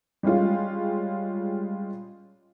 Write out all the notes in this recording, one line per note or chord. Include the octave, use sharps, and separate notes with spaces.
G3 G#3 C#4 F4